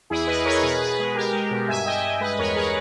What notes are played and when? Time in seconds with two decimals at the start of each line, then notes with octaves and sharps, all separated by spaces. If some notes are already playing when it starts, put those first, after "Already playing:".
0.10 E2 E4 G#4
0.27 E2 B4 D#5
0.45 E2 A#4 C#5
0.63 B2 G#4 B4
0.80 B2 G#4 B4
0.99 G#3
1.15 G#3 G4 A#4
1.33 G#3
1.51 B2
1.68 G2 E5 G#5
1.86 G2 D#5 G5
2.04 G2
2.20 G#3 B4 D#5
2.38 E2 A#4 C#5
2.56 G#4 B4